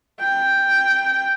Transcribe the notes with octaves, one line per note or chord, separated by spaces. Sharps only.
G5